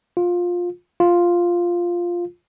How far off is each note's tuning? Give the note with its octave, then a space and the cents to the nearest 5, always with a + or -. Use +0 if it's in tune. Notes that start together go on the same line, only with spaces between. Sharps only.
F4 +15
F4 +0